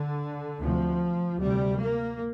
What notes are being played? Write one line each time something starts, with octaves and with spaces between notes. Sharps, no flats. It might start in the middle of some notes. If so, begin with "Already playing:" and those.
Already playing: D3
D2 C3 F3
D2 C3 G3
A#3